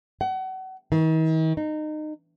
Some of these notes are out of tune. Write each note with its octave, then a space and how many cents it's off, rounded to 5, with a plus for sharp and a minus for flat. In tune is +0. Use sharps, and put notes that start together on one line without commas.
F#5 +35
D#3 +45
D#4 -25